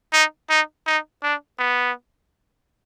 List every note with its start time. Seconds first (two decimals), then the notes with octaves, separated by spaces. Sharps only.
0.13 D#4
0.50 D#4
0.87 D#4
1.23 D4
1.59 B3